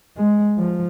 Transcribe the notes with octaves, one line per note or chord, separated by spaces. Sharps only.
G#3
F3